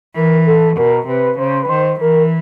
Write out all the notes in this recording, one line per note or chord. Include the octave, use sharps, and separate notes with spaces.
E3 A#4
A4
B2 A#4
C3 B4
C#3 C5
B4
D#3 C5
E3 A#4